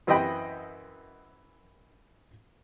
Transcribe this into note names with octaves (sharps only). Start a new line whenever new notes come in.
F#2 E3 C5 D#5 G5 B5